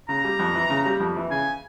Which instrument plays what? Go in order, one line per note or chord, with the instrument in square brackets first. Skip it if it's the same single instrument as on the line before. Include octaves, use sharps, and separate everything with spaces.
[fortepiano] C#3 [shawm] A#5
[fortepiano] G3
F2
E3
C#3
G3
F2
E3
[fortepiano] C#3 [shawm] G#5